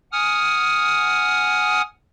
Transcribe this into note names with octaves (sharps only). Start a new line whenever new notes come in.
F#5 G#5 D#6 F6